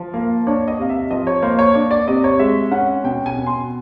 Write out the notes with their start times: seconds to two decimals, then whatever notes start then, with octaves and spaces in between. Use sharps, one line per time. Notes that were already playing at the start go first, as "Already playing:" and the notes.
Already playing: F3
0.14 A#3
0.47 D4 C#5
0.68 D#5
0.79 C3 F5
0.89 E5
1.10 F3 D#5
1.27 C#5
1.42 A#3 C5
1.59 C#5
1.75 D4
1.91 D5
2.07 C3 D#5
2.24 C#5
2.39 G#3 E5
2.71 C#4 F#5
3.04 B2 G5
3.26 G#5
3.37 B2
3.47 C6